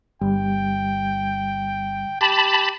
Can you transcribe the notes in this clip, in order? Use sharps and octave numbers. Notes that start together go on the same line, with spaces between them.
G1 G3 G5
G4 A5 B5